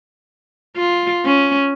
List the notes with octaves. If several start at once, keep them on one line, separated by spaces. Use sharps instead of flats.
F4
C#4